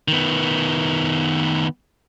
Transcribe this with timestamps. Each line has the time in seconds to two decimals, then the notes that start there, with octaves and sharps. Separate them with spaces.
0.08 D#3 B3